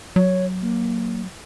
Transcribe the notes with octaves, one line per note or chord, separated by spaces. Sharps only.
F#3 C#5
A#3